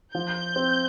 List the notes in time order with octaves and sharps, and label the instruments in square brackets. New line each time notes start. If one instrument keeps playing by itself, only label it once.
[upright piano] F3 [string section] G6
[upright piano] C4